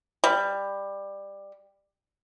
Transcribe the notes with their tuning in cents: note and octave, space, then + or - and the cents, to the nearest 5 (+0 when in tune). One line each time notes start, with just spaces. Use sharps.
G3 +15